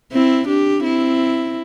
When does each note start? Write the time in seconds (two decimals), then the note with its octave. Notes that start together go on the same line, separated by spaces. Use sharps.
0.12 C4 E4
0.48 D4 G4
0.84 C4 E4